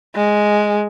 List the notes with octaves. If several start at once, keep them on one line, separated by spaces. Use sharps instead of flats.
G#3